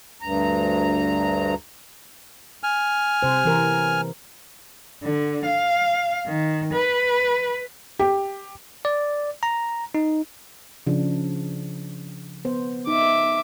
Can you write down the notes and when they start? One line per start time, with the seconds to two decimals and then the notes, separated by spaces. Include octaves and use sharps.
0.21 D2 G2 A#5
2.63 G#5 F6
3.23 C3 C5
3.45 E3 A#4
5.03 D3
5.45 F5
6.26 D#3
6.74 B4
7.99 G4
8.85 D5
9.43 A#5
9.95 D#4
10.87 C#3 F3 D4
12.45 B3 C5
12.87 D#4 E5 D6